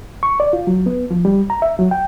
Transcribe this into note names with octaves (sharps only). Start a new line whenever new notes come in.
C#6
D5
F4
F#3
B3
F3
G3
A#5
E5
F#3
G5